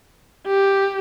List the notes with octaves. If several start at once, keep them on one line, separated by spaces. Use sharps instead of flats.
G4